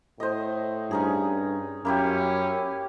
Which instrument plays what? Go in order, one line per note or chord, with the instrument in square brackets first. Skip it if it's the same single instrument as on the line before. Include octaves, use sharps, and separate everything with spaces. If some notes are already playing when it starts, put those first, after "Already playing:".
[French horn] A2 [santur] C5 D#5
[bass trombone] G2 [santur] C#4 D#4 G#4
[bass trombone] F#2 [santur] A#3 E4 G4 [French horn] C#4